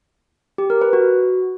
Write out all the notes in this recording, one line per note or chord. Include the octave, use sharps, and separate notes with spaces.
G4
A#4
B4
F#4